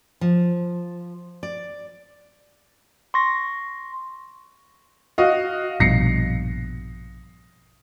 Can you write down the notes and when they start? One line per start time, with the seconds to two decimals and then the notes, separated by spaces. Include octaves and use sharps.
0.21 F3
1.43 D5
3.14 C6 C#6 A#6
5.18 F#4 D#5 F5
5.80 A#1 G2 B2 A#6 C7 C#7